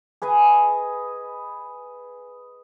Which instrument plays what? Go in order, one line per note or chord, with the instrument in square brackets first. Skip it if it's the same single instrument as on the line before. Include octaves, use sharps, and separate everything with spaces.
[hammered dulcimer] G#4 B4 D#5 G#5